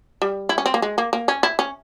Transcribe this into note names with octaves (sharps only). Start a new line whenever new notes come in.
G3
E4
C#4
C4
A#3
G#3
A#3
A#3
C#4
E4
C#4